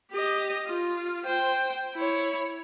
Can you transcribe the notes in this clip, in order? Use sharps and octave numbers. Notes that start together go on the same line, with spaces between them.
G4 D#5
F4
C5 G5
E4 C#5